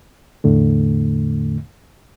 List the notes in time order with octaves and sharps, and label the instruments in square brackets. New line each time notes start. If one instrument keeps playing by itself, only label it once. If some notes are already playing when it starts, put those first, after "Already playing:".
[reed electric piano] E2 A2 D3 A3